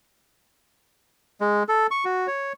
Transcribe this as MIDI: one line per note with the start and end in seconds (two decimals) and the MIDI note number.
1.41 1.63 56
1.69 1.87 69
1.91 2.05 85
2.05 2.27 66
2.27 2.53 73